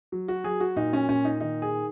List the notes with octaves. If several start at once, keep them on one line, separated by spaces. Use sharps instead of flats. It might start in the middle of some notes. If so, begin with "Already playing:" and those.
F#3
F#4
F#3 G#4
F#4
A#2 D#4
C#4
A#2 C#4
D#4
D#3 D#4
G#4